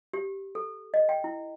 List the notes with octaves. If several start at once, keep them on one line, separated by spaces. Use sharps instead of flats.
G4
A4
D#5
G5
E4